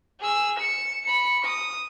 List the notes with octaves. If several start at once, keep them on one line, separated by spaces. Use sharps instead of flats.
G#4 E6
C#7 E7
B5 C#7
D#6